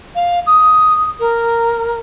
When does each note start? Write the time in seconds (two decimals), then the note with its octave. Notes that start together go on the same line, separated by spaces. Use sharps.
0.15 F5
0.47 D#6
1.20 A#4